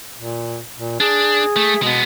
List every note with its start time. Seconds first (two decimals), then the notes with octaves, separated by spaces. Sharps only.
0.16 A#2
0.77 A#2
1.00 D4 G#4
1.56 A3
1.82 B2 G#3 B3